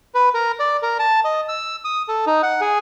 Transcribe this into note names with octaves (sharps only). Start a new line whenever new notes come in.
B4
A#4
D5
A#4
A5
D#5
E6
D#6
A4
D#4
F#5
G#4